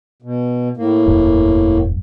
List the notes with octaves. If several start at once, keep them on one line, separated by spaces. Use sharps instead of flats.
B2
A2 A#3
E1 A1 F#2